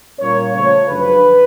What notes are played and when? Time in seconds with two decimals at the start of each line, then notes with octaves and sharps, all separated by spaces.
0.19 A#2 G3 A#3 C#4 C#5
0.53 C#3 F3 A3 C#5
0.87 F#2 D3 F3 G#3 B4